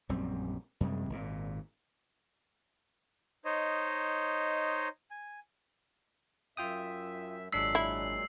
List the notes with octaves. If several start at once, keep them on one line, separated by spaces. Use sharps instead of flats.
A#1 F#2 G3 C4
F#2 C3 G3 G#3
G#1 A#2
D#4 C5 C#5 D#5
G#5
F#2 F4 E5 G5 D#6
G#1 A#2 F#3 G#3 D4 E6 B6 C7
E4